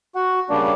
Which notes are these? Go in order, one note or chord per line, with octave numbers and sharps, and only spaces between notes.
F#4 F#5
C#3 G3 A#3 D4 D5